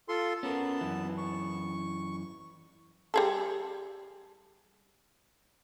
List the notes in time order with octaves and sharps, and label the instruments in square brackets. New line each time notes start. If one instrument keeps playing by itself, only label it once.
[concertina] F4 A4 C6
[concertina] B3 A5 [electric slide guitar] C#4 A#4
[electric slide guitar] F#2 E3
[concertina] C#6
[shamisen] G3 G#4 A4